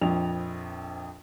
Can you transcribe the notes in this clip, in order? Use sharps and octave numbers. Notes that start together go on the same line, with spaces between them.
A#1 F2 F7